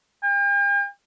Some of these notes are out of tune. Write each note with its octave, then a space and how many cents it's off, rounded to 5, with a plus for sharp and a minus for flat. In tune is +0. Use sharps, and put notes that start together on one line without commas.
G5 +45